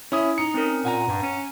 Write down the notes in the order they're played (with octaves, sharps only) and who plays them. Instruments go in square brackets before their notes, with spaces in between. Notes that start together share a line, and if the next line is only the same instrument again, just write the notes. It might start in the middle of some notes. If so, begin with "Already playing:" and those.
[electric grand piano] C#4 E4 D#6
[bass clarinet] D#4 [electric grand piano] C#7
[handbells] C4 C#4 A#4
[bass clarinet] A#2 [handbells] F#5 G#5 A#5
[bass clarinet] G2
C#4